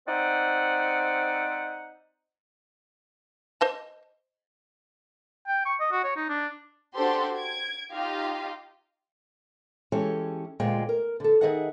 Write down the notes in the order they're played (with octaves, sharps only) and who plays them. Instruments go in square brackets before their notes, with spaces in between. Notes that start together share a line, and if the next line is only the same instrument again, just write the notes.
[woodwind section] C4 D#4 C5 D5 E5 F#5
[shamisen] C5 D#5 A5
[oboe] G5
C#6
D#5
F#4
C#5
D#4
D4
[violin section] D4 F#4 G4 A4 C5 C6
G#6 D7
D#4 F4 G4 D#5 F5
[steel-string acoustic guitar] E3 G#3 C#4 G4 A4
D2 A#2 G#3 F4 G5
A#4
D3 A4
D#3 A#3 G#4 D#5 E5 F#5